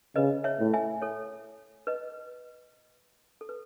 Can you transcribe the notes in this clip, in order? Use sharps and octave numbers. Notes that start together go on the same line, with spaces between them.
C#3 B4 D#5
C#5 E5
A2
E5 G#5
A4 C#5
B4 D#5
A4
B4